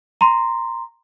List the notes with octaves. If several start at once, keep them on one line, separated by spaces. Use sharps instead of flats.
A#5 C6